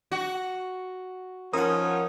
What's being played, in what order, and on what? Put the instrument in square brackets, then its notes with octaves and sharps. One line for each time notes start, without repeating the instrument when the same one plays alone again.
[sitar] F#4
[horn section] F3 C#4 D#4 [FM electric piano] A#4 F#5 [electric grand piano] D#6